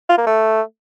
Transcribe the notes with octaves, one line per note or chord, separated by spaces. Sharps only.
F4
A#3
A3